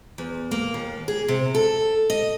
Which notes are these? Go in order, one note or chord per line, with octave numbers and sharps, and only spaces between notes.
E2
A#3
D#2
G#4
C3
A4
D#5